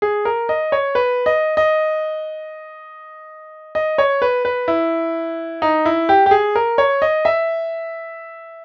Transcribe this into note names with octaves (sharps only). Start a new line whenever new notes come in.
G#4
A#4
D#5
C#5
B4
D#5
D#5
D#5
C#5
B4
B4
E4
D#4
E4
G4
G4
G#4
A#4
C#5
D#5
E5